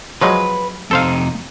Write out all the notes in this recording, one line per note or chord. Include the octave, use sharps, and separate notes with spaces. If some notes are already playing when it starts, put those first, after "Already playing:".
F3 F#3 G#3 B4
F2 C3 D#4 A4 C5 F5